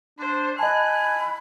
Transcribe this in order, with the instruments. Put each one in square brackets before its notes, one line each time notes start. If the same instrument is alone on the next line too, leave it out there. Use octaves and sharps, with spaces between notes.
[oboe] D4 [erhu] C5
[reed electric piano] D#5 A5 [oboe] G#5 [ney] B5 [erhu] F#6